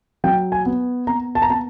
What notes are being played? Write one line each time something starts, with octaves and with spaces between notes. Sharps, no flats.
F#3 G5
G#5
B3
B3 A#5
A5
A#5
B3 A5